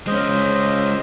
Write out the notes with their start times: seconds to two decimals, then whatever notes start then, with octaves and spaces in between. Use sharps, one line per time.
0.07 G#3 C#4 C5 D#5